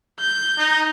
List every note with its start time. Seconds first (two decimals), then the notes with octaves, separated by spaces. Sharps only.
0.20 G6
0.58 D#4